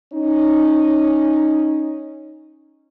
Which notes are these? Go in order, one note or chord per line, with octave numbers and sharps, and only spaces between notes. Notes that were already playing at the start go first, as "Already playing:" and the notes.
C#4 D#4